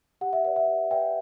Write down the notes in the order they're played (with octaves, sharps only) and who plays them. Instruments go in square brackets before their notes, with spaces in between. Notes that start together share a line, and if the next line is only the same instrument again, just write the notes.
[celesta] G4 F#5
E5
B4 D5 F#5
E5
G4
B4 D5 E5 G5